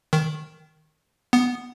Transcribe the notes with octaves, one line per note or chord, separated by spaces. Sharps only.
D#3
B3